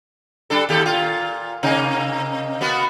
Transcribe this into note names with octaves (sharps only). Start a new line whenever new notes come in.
G3 D4 A4
D#2 G4 A4
A#2 F4
C3 A#3 D#4
A#3 B3 F#4